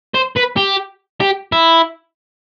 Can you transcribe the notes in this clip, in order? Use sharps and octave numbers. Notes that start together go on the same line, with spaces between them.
C5
B4
G4
G4
E4